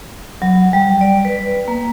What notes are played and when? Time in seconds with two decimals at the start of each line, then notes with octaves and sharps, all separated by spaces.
0.42 F#3
0.73 G3
1.01 D5
1.25 B4
1.68 A#3